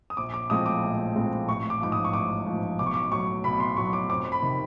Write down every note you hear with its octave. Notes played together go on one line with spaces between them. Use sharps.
D#6
A#1 D6
D6
A2 F3 G#3 C4 D#6
D6
A#1
A2 F3 G#3 C4
A1 C#6
D6
G#2 F3 D6
D#6
C#6
A1 D6
G#2 F3
B1 D6
C#6
D6
A2 F#3 C#6
B1 B5
C6
A2 F#3 C#6
D6
F2 D6
B5
C3 D#3